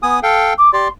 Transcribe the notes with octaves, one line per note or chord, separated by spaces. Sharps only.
B3 G#5 D#6
A4 F5 G5
D6
G4 D5 C6